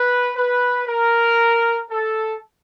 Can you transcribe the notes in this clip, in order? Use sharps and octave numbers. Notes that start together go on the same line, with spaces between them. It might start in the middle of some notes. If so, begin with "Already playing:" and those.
Already playing: B4
B4
A#4
A4